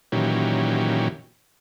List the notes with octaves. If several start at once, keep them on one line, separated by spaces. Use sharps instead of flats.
A#2 D#3 E3 F#3 C#4 G4